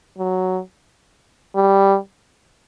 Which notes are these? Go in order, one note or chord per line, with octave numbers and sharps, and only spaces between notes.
F#3
G3